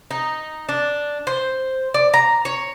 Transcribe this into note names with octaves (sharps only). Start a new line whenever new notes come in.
D#4
D4
C5
D5
A#5
C#5